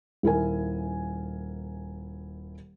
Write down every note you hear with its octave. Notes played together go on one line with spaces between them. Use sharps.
D#1 E4 A#4 G#5